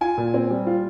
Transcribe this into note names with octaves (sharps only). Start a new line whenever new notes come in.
F4 G#5
A#2
C4
G3
F4